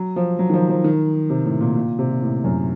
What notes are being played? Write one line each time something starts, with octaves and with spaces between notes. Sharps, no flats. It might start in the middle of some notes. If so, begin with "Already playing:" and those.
Already playing: F#3
F3
F#3
D#3
F3
F3
D#3
C3
A2
A#2
A#2
C3
A#2
A2
F#2